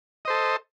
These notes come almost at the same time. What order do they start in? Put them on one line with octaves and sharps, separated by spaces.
D#5 C5 A4